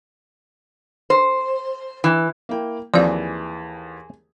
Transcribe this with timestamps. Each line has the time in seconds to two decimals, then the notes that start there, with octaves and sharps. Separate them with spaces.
1.10 C5
2.04 E3
2.49 A#3 E4 G5
2.94 D#2 E3 F3 C4 G#4 D5 F5